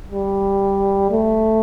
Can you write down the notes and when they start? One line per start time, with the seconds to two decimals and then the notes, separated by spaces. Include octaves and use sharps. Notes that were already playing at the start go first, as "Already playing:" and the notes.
0.11 G3
1.11 A3